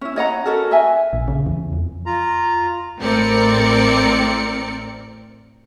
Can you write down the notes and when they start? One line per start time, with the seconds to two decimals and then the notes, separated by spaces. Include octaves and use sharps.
0.01 C#4 E4
0.16 C#5 D#5 F#5 A#5
0.46 C#4 F#4 A4 A#4
0.71 D#5 E5 G#5
1.13 A#1
1.28 C#3
1.46 E2
1.73 F2
2.06 F4 A#5
2.99 A1 A2 C4 A#4 D5 C#7